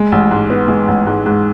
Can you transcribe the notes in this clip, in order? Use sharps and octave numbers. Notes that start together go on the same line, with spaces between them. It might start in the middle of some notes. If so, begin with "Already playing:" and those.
Already playing: G#3
A1
G#2
B3
G#3
A1
G#2
G#2